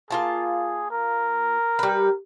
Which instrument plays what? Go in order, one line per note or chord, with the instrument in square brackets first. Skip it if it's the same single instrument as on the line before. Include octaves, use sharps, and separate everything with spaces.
[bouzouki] A#3 F4 A5 [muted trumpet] G#4
[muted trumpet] A#4
[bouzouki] G3 B4